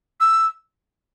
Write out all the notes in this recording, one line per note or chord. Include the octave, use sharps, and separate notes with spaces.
E6